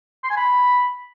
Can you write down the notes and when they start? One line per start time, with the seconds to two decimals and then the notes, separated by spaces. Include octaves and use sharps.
0.24 C6
0.30 G#5
0.37 B5